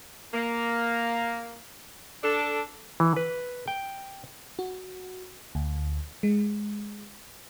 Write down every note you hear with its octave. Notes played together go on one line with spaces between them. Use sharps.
A#3
D4 A4
E3
B4
G5
F#4
D2
G#3